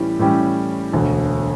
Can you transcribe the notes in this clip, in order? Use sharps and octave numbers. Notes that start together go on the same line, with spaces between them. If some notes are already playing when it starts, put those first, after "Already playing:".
Already playing: A2 E3 G3 C#4 G4
A2 E3 G3 C#4 G4
E1 D2 D3